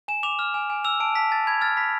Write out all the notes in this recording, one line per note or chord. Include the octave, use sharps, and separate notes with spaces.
G#5 E7
D6 F7
F6
G#5
G#5
E6 F7
A5 D7
A5 B6
A5 A6
B5 G#6
F6 A6
B5 B6